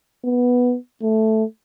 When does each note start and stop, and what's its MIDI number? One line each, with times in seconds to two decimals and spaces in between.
0.25 0.76 59
1.01 1.44 57